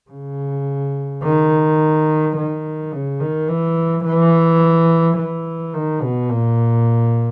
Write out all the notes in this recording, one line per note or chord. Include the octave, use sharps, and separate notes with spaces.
C#3
D#3
D#3
C#3
D#3
E3
E3
E3
D#3
B2
A#2